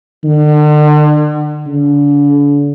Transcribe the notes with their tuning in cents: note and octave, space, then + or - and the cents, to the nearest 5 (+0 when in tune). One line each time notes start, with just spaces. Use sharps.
D3 +40
D3 -35